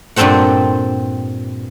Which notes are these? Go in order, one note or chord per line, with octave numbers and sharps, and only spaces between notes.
G2 A#2 C4 A4 C5 F#5